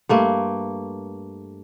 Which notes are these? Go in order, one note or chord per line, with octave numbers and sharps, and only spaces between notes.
G2 A3 A#3